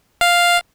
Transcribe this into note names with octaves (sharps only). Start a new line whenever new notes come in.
F5